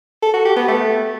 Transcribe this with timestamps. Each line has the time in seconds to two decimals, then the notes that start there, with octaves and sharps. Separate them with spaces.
0.22 A4
0.34 F#4
0.45 G4
0.57 B3
0.68 A3